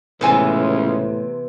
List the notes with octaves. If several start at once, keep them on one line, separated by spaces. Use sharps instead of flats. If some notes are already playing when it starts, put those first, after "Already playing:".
C#2 A2 C3 E3 B3 C5 G#5